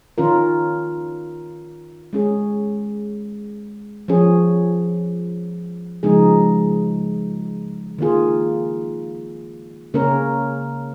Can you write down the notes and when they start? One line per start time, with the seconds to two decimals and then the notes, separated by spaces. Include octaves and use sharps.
0.18 D#3 C#4 F4 A#4
2.13 G#3 C#4 G#4
4.08 F3 C#4 G#4
6.03 C#3 F3 G#3 D#4 G#4
7.98 D#3 A#3 F4 G#4
9.94 C#3 A#3 C#4 A#4